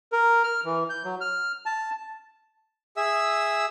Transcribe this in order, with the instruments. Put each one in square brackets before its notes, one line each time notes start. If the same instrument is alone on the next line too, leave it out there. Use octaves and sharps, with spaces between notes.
[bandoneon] A#4
F6
E3
G6
F#3
F6
A5
[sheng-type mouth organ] G#4 E5 E6